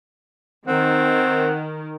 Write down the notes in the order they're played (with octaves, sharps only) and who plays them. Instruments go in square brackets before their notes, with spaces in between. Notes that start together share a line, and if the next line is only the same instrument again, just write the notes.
[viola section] D#3 [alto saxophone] C4 [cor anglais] F#5